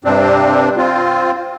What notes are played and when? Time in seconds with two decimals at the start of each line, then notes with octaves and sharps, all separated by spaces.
0.04 G2 C3 C4 D4
0.77 C4 F4